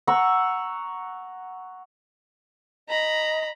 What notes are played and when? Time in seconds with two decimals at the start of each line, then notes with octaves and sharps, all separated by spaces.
0.07 F#5 A#5 C#6 E6
2.89 D#5 A#5 B5